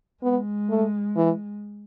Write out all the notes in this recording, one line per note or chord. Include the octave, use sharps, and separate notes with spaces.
G#3 B3
A3
E3